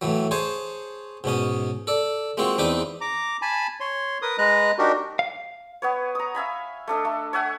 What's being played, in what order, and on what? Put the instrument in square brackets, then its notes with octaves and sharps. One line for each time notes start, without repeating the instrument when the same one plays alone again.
[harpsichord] A2 E3 F#3
G#4 C5 C#5 G#5 A5
G#2 B2 C#4 D#6
A4 D5
G#3 A#3 C4 F4 F#4
E2 C4 D4 D#4 B4 D6
[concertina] A#5 D6
G#5 A5 B5
C#5 C6
A#4 B4 D#6
G#3 B4 D#5 A#5 F#6
D4 D#4 F#4 G4 A#4
[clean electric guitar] F5
[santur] B3 B4 C#5
A#5 D#6
E5 F5 G#5 B5
A3 D4 A4 D#5
A3
C#5 E5 F#5 G#5